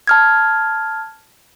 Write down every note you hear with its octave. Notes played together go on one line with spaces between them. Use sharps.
A5 F6 G#6